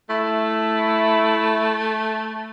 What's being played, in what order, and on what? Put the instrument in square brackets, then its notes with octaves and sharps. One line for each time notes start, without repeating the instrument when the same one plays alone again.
[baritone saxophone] A3 [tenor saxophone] E4